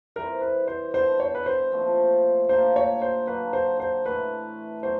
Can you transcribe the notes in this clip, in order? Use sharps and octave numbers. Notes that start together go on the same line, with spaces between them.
E3 G3 C4 A#4
B4
C5
D3 G3 B3 C5
C#5
B4
C5
A#2 F3 A3 C4
A#2 G3 A#3 D4 C5
C#5
C5
D3 F#3 A#3 B4
C5
C5
A2 E3 A3 B4
F#3 B3 C5